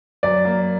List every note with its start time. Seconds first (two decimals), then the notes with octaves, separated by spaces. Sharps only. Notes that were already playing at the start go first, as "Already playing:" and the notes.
0.23 F#2 D5
0.45 A#3